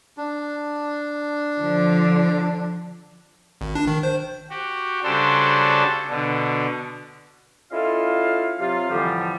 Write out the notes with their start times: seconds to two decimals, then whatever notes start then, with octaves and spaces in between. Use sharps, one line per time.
0.17 D4
1.60 D3 F3
3.61 G#1
3.75 D4
3.87 D#3
4.03 C5
4.50 F#4 G4
5.04 C#3 G3 D4 F#4 A4 C5
6.09 B2 D3
7.71 C#4 E4 F4 A4 D#5 F5
8.59 C3 F#3 F4 F5
8.90 F2 A2 D3 E3 F3 G3